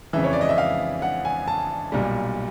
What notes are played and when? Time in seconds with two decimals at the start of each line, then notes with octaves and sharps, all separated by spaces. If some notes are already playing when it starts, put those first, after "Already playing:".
0.13 F2 C#3 E3 E5
0.24 C#5
0.33 D5
0.41 D#5
0.49 E5
0.58 F5
1.02 F#5
1.25 G#5
1.48 A5
1.92 B1 A#2 G3